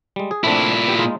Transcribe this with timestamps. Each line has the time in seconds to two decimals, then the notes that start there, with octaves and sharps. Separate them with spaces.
0.16 G3 G#3
0.31 G#4
0.44 A#2 A3 C4 D4 E4
0.87 B3 G4
0.99 G#3 D#4 F4